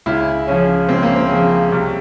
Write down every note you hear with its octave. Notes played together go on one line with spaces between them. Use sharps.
C#2 E4
C#3 F3 C#4
C#2 C4
A#3
C4
C#3 F3
C2